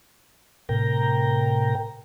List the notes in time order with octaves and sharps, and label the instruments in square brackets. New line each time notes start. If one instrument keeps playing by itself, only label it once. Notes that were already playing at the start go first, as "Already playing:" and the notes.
[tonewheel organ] A2 C3 A#4 G5 A#5